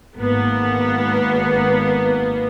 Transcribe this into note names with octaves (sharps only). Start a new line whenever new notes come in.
G#1 A#3 B3